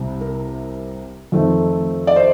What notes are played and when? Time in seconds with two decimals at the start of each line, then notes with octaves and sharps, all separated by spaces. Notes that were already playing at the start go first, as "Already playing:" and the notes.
Already playing: C2 C3 G3
0.21 A#4
1.32 F2 D#3 A3 C4
2.07 D5
2.16 C5